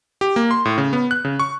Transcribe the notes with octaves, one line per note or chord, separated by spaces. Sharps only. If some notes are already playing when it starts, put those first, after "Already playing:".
G4
A#3
C6
A2
C#3
B3
F#6
C#3
C#6